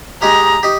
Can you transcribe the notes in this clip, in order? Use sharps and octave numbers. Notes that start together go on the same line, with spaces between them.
G#3 D#4 G4 A#5
D#4 G4